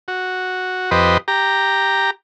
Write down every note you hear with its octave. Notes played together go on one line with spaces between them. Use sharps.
F#4
F2 G4 B4 C5 D#5
G4 A#5